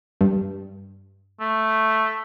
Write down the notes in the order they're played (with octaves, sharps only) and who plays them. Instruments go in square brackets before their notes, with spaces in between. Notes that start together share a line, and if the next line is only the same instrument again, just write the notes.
[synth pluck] G2
[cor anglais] A3